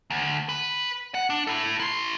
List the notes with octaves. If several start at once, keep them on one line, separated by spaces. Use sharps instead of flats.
D2
B4
F#5
D4
E4 A4
E4 C6